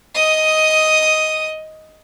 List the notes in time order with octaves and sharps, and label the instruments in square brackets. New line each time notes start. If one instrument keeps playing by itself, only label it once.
[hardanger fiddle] D#5 D#6